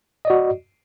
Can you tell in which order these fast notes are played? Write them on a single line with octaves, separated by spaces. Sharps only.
D#5 D5 F#4